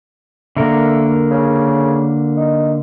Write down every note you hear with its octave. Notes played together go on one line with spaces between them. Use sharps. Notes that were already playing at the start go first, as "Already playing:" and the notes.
D3 A3 A#3 A#4
C#3
D#4